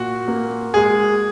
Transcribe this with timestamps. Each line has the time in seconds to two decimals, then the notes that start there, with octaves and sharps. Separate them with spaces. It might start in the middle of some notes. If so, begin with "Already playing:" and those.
Already playing: A#2 F#4
0.28 A#3
0.74 G#3 G#4